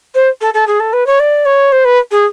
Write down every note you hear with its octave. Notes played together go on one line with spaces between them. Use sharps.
C5
A4
A4
G#4
A4
B4
C#5
D5
C#5
C5
B4
G#4